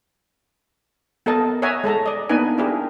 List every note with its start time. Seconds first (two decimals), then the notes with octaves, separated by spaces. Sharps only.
1.26 B3 A4 A#4 D#5 A5
1.62 C#5 D#5 E5 F#5 G#5 A#5
1.84 G#3 A4 A5 A#5
2.06 D5 D#5
2.29 A#3 B3 D4 D#4 B4 G#5
2.58 D4 E4 G4 G#4 A#4